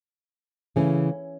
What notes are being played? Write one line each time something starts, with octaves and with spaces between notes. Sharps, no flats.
C#3 E3 A3 C#4